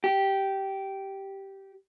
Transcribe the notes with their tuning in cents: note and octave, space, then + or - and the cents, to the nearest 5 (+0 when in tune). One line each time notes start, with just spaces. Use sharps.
G4 -10